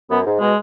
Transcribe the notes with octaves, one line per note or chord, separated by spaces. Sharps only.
F#2 B3
G#2
B2 G#3